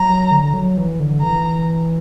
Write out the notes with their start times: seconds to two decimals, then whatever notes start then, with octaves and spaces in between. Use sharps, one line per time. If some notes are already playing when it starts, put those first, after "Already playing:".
Already playing: F#3 A#5
0.31 D3
0.53 F#3
0.77 E3
1.00 D3
1.21 E3 A#5